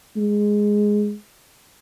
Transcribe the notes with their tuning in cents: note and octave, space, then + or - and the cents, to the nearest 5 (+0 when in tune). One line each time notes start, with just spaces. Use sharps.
G#3 +0